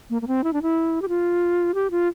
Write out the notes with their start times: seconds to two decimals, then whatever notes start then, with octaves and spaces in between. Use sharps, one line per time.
0.10 A#3
0.22 A#3
0.27 C4
0.44 E4
0.53 D4
0.62 E4
1.02 G4
1.09 F4
1.74 G4
1.91 F4